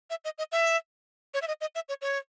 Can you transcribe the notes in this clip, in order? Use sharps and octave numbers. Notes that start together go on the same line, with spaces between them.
E5
D#5
D#5
E5
C#5
E5
D#5
D#5
E5
C#5
C#5